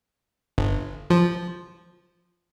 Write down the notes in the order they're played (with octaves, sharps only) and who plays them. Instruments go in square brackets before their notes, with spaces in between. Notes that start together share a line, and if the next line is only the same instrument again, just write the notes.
[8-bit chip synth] G1
F3